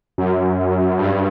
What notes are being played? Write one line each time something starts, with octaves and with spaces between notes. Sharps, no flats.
F#2
G2